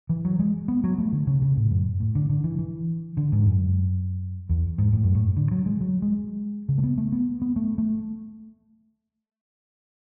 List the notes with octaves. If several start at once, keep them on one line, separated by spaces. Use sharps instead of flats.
E3
F#3
G#3
B3
F#3
A3
D3
C#3
C#3
A2
F#2
A2
D3
D3
E3
E3
D3
G#2
F#2
E2
G#2
A2
F#2
A2
D3
F#3
G#3
F#3
G#3
C#3
A3
B3
A3
B3
B3
A3
A3